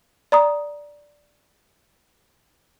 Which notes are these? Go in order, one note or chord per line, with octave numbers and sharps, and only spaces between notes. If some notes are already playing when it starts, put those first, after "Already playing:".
D5 A#5 D#6